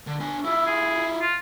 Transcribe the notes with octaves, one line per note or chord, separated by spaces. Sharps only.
D3
D4 G#5
E4 F4 E5
G#4
F4